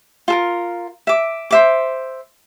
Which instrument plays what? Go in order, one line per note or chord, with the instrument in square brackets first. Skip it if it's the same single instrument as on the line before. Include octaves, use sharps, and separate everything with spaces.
[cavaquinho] F4 A4 A#4
E5 D6
C5 E5 D6